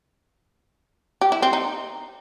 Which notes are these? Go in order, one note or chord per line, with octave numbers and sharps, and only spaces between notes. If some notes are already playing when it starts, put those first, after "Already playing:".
G4
E4
C4
D#4